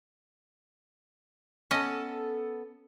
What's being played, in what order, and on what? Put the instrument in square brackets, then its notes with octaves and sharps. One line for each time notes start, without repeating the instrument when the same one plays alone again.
[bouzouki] B3 A4 [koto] C#4 D#5